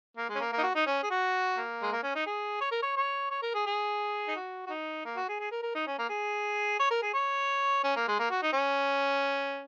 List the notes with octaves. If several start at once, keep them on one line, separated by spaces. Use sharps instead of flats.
A#3
G#3
C#4
A#3
A#3
D#4
F#4
D#4
C#4
G#4
F#4
A#3
G#3
A#3
C#4
D#4
G#4
C#5
A#4
C#5
C#5
C#5
A#4
G#4
G#4
D#4
F#4
F#4
D#4
A#3
F#4
G#4
G#4
A#4
A#4
D#4
C#4
A#3
G#4
C#5
A#4
G#4
C#5
C#4
A#3
G#3
A#3
F#4
D#4
C#4